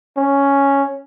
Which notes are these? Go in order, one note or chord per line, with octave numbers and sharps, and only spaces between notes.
C#4